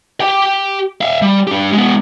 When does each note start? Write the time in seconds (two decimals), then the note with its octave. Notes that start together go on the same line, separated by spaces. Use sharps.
0.20 G4 G5
1.01 E5 F5
1.22 G3
1.47 D4 G4
1.72 G#3 B3